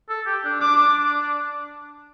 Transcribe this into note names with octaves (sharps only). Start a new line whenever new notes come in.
A4
G4
D4
D4 D6